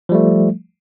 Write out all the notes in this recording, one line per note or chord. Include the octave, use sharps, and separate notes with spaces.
F3 G3 A3